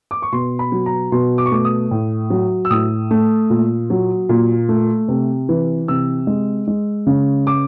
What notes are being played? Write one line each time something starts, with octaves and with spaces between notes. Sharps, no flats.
D6
C#6
B2 C6
B5
F#3
A#5
B2 C6
D6
C#6
A3 D6
D#6
A2
F#3
E6
A2 D#6
A3
A#2
F#3
A#2
A3
C3
E3
C3 E6
G#3
G#3
C#3
D6